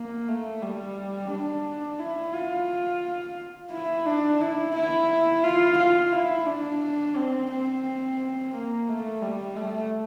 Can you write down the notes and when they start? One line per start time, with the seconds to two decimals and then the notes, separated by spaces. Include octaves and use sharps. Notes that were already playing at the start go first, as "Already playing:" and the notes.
Already playing: A#3
0.28 A3
0.62 G3
1.31 D4
1.99 E4
2.34 F4
3.71 E4
4.06 D4
4.41 E4
4.75 E4
5.44 F4
5.78 F4
6.12 E4
6.47 D4
7.16 C4
7.50 C4
8.54 A#3
8.89 A3
9.22 G3
9.57 A3